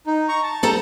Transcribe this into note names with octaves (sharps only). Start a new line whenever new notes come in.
D#4
A#5 C#6
A5
G3 A4 A#5